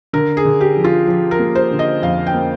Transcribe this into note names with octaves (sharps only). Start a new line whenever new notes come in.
D3 A#4
G#4
D3
G4
F3
F4
F3
A#4
A#3
C5
D3
D#5
F2 F5
G5
A#3